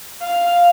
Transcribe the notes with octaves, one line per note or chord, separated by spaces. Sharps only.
F5